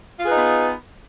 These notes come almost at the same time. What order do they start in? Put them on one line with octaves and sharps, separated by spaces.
F4 G#4 B4 D#4 B3